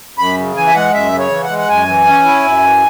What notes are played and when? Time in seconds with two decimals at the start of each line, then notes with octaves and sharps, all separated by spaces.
0.18 F#2 B5
0.37 C#3
0.56 E3 G#5
0.68 E5
0.75 G#3 F#5
0.93 F#2 E5
1.12 C#3
1.19 C#5
1.31 E3
1.43 F#5
1.50 G#3
1.59 F#5
1.69 F#2 G#5
1.88 E3
2.06 C#4
2.25 E4
2.44 F#2
2.63 E3